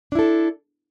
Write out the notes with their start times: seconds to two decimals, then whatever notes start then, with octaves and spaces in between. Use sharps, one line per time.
0.12 D4
0.15 E4
0.19 A4